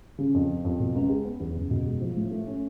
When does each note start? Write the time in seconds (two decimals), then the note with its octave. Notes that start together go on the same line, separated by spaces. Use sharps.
0.18 C#3
0.34 F2
0.50 F3
0.65 F2
0.80 B2
0.95 C#2
1.09 G#3
1.25 B3
1.40 E2
1.56 F#1
1.71 B2
1.86 G#3
2.01 F3
2.17 A2
2.31 A3
2.47 C#4